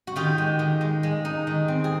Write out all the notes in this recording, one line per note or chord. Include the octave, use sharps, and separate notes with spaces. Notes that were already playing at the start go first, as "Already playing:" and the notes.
F#4
D#3 F4 G4
G#3
D#3
G#3
G#3
D#4
D#3
C4
G#4